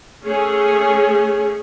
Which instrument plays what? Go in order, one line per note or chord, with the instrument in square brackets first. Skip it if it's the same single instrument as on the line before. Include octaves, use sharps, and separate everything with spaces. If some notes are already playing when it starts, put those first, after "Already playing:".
[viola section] A3 C#4 G#4 C#5